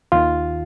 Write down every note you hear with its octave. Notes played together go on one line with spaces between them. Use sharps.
D#2 D#3 F4